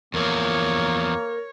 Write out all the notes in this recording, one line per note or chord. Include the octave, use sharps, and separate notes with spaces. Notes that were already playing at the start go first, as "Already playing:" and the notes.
E2 F3 A#3 A#4 C#5